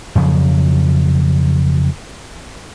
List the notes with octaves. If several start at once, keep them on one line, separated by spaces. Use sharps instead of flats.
F2 C#3 F3 F#3